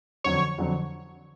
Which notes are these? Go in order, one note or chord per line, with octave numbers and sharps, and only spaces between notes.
F2 D3 F#3 C#5
F2 D3 F#3